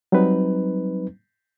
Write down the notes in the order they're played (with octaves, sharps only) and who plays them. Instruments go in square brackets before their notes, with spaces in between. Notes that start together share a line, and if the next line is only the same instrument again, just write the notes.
[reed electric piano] F#3 G3 C4 D#4 B4